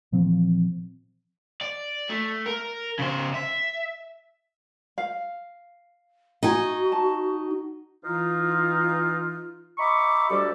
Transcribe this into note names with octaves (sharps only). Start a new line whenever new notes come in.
A#2 E3 F3 C4
D5
A3
A#4
C#3 C5
E5
F5
D#4 F#4 G#5
A5
E3 D#4 F4
D#5 E5 A#5 B5 C#6 D6
D2 G3 G4 A4 D5 D6